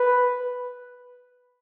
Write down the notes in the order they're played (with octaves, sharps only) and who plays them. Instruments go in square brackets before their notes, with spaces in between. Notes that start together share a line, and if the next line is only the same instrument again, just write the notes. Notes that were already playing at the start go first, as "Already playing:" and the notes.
Already playing: [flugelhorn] B4